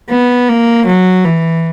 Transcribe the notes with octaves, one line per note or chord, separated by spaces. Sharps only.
B3
A#3
F#3
E3